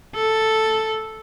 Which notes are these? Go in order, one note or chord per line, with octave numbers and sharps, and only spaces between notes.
A4